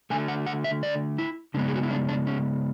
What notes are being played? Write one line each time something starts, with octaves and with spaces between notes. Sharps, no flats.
D3 A3 G#5
F#5
F#5
E5
D5
E4
C#3 G#3 B3 D4
G#4
F#4
E4
D4
D4
C#4